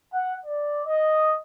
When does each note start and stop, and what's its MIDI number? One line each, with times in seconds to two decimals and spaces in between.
0.12 0.33 78
0.45 0.80 74
0.85 1.36 75